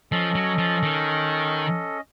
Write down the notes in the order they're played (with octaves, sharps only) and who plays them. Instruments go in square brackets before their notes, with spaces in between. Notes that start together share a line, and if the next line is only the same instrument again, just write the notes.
[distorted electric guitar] F3 [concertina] C#4 A4 D#5
[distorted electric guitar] F#3
F3
D#3